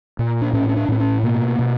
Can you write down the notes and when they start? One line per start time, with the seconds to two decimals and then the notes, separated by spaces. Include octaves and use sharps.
0.19 A#2
0.42 D4
0.53 A2 C#4
0.69 C#4
0.77 D4
0.89 A2 C4
1.00 C#4
1.23 B2 A#3
1.59 B2